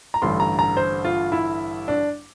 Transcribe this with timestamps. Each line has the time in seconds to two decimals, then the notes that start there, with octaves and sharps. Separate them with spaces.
0.14 A#5
0.22 A1 G2 D3 C6
0.40 A#5
0.59 A#5
0.77 C5
1.04 F4
1.32 E4
1.88 D4